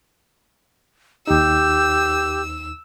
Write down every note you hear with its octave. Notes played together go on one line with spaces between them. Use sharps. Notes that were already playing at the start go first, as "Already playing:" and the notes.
D#2 D#4 G4 E6